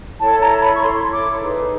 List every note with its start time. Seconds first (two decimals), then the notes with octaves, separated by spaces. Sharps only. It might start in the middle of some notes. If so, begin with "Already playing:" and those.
0.19 E4 A4 C#5 A5
0.40 A#5
0.61 B5
0.74 C#6
0.80 E4 A4 C#5 C6
1.11 D6
1.41 D#4 G#4 B4